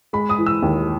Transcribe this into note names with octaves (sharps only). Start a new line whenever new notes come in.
G#3 B5
D#6
E3
E6
D#2